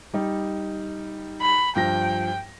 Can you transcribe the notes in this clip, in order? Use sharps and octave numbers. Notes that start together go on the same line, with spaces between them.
G3 D#4
B5
G2 F3 G5 A#6